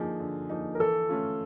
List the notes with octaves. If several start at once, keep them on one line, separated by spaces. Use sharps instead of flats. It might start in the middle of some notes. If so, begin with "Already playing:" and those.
Already playing: D3 F3 A#3 D#4 G#4
D3
F3 A#3 D#4
A#4
E3 A4
A3 C#4 F4